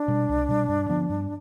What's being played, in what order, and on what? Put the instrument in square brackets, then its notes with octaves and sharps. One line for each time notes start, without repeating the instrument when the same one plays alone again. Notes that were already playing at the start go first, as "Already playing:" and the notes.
Already playing: [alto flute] D4
[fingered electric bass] B2 G3
C2
B2 G3
G2
D3 F3 B3
G2